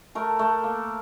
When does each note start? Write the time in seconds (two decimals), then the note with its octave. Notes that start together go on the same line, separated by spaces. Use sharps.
0.15 A3 A#4
0.39 A3
0.64 A#3